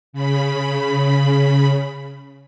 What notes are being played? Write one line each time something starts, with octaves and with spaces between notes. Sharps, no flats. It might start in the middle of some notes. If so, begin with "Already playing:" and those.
C#3 B5